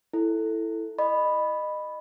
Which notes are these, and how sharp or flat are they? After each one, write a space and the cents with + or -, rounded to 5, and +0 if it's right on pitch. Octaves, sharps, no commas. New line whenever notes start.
E4 +0 A4 +0
D#5 -25 B5 +0